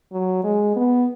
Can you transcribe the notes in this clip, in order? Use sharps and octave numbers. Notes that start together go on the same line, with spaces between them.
F#3
G#3
B3